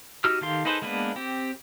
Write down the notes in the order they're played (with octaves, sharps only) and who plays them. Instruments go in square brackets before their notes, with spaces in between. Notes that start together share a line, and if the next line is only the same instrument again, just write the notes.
[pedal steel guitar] D#4 F#4 G4 E6 F6
D#3 G4 A4 F5 C6
D#4 G#4 A4 B4 C5
G#3 A#3 B3 D4 B4
C4 G4